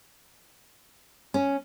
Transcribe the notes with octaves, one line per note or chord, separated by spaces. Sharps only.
C#4